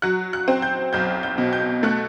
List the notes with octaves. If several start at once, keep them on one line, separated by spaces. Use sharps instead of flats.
F#3 F#6
F#6
C4
G6
B1 G6
G6
B2
G6
A3 F#6